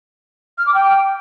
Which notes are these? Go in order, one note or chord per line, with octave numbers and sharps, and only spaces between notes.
F6
D6
G5